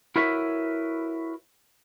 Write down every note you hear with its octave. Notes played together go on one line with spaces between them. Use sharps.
E4 F#4 A#4 B4 C#5 E5